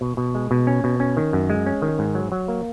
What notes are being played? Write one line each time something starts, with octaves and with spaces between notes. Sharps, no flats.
B2
B2
G#3
B2
C#4
B2
C#4
D#3
F#2
G#3
C#4
D#3
G#2
F#3
F#3
A#3